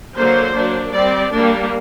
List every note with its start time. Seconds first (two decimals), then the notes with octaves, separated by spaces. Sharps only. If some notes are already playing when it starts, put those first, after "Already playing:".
0.17 D3 F#3 A#3 C5
0.54 F#3 A#3 D4
0.92 G3 C4 D5
1.31 G3 A#3 D4